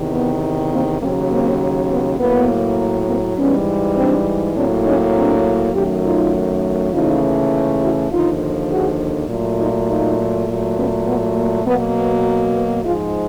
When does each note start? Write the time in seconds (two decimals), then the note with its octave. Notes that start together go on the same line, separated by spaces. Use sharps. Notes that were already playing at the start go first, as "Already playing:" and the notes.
Already playing: E2 C3 D#3
0.12 B3
0.72 A#3 C4
1.00 D#2 C#3 F#3 A#3 C4
1.30 A#3 C4
1.90 B3
2.19 A2 F#3 A#3 B3
3.08 A#3 C4
3.37 G#2 E3 G3 B3 C#4
3.97 C4 D4
4.55 A2 F#3 A#3 C4 D4
4.85 C#4 D#4
5.15 C4 D4
5.74 F#2 D#3 F#3 A3 F4 G4
6.03 D#4 F4
6.92 D#2 C#3 E3 A3 D#4 F4
7.81 E4 F#4
8.10 D#2 D3 F3 D#4 F4
8.69 F#4 G#4
9.28 A#2 F#3 A3
9.59 D#4 F4
9.88 D#4 F4
10.47 A#2 F#3 A3
10.77 B3 C#4
11.06 B3
11.36 A#3
11.65 B2 F#3 A#3 B3
11.95 B3
12.54 B3
12.84 G#2 F3 G#3 D#4 F4